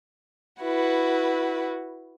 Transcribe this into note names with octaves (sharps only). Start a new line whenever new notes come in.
E4 F#4 B4